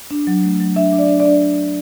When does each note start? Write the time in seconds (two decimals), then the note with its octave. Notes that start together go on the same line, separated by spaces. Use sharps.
0.11 D4
0.27 F#3
0.44 A3
0.60 F#3
0.76 D4 E5
0.93 D4
0.99 D5
1.08 D4
1.20 D5
1.25 D4